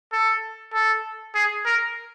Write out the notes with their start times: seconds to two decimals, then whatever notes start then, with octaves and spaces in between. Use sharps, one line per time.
0.13 A4
0.73 A4
1.35 G#4
1.66 A#4